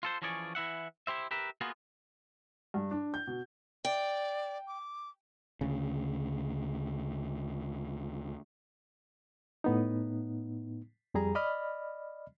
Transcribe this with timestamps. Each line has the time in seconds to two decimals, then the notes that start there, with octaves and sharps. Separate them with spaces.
0.03 F4 A4 C5
0.22 E3 F3 C#4 G#4 C#5 D5
0.55 E3 E4 E5 F#5
1.07 E4 G4 C5 E5
1.31 G4 A#4 B4 E5
1.61 A#3 B3 F4 F#4 G#4
2.74 G2
2.91 D4
3.14 G6
3.27 B2
3.85 D5 G5
4.67 D6
5.61 D2 C#3
9.64 A2 B3 D#4
11.14 F2 G3 G#4 A#5
11.35 D5 D#5 B5 F6